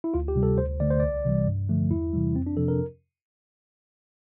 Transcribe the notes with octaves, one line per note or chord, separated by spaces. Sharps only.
E4
D2 F4
G4
C3 G3
A4
D2 C5
D3 A3 D5
C5
C2 D5
C3 E3 G3
G2
D3 F3 A3
E2 E4
C3 E3 G3
F2 C4
D4
C3 F3 A4
A#4